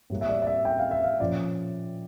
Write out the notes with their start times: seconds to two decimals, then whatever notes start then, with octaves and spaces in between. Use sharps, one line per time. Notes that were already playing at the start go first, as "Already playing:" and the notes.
0.10 A2 G3 A#3
0.21 E5
0.29 D5
0.42 D5
0.47 E5
0.65 G5
0.79 F5
0.91 E5
1.04 F5
1.20 A#2 F3 C#4 D5